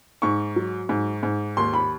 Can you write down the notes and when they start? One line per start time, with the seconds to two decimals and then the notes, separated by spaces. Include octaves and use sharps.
0.22 G#2 C#6
0.56 F#3
0.89 G#2
1.23 G#2
1.57 D#2 C6
1.73 B5